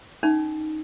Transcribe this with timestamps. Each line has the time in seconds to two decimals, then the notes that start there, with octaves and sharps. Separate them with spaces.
0.23 C#4 D#4